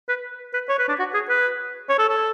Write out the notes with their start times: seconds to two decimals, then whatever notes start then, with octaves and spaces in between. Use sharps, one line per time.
0.09 B4
0.54 B4
0.69 C#5
0.79 B4
0.89 D4
0.99 F#4
1.14 G#4
1.29 B4
1.89 C#5
1.99 A4
2.09 A4